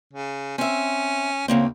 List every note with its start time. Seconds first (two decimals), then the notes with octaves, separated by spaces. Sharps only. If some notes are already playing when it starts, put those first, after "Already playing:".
0.13 C#3
0.58 C4 C#4 E5
1.48 D2 C#3 A#3 C4